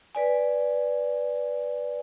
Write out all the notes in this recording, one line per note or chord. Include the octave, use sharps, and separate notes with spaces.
B4 D5 G#5